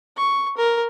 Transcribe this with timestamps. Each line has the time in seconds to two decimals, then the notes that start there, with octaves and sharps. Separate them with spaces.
0.17 C#6
0.57 A#4